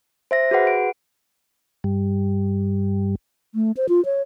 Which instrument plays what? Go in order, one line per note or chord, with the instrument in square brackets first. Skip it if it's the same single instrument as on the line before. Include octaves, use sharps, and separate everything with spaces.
[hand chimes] C5 E5 A#6
F#4 G#4 B4 F#5
D7
[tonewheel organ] G2 G3
[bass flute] A3
C5
F4
C#5